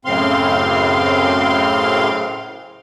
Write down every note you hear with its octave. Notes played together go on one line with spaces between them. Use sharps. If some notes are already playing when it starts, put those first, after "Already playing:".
F#2 A2 C#3 C4 F5 C6